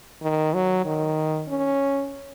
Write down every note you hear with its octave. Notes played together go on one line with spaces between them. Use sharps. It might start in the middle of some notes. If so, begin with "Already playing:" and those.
D#3
F#3
D#3
C#4